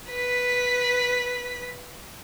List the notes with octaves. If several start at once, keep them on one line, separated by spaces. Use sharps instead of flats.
B4 B6